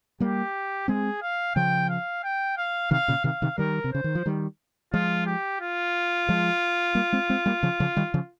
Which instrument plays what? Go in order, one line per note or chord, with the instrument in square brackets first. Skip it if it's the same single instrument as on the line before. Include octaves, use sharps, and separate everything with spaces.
[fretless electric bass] G3 A#3 [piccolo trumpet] G4
[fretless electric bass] G#3 C4 [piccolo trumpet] G#4
[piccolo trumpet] F5
[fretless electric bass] C#3 F3 [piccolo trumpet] G5
[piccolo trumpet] F5
G5
F5
[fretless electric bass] C3 D#3 [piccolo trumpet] F5
[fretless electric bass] A#2 C#3
[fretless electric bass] C3 D#3 [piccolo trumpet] F5
[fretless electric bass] C3 D#3
[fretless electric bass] D#3 G3 [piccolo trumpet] A#4
[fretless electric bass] C3
[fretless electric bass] C#3 [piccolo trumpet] C5
[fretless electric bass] D#3
F3
D#3 G3
[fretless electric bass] F3 G#3 [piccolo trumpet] F4
[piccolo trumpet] G4
F4
[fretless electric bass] F3 G#3
G3 A#3
G#3 C4
G#3 C4
G3 A#3
C#3 F3
C#3 F3
D#3 G3
C#3 F3